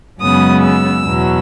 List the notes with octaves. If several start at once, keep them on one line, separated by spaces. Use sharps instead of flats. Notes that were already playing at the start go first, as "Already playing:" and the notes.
F#2 C#3 G#3 B3 D#6
E6
E2 B2 F#3